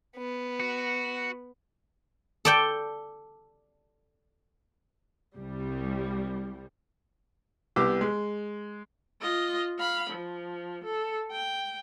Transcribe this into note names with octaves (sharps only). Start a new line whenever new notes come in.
B3
F#4
A4 D5 G5
C2 G3
C2 B3 G4 D6 E6
G#3
F4 D#5
F5 B5
F3
A4
G5